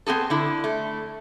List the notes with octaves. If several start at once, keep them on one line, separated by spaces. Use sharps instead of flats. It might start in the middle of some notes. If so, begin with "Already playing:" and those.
B3 C4 G#4 A4
D3 E4
A3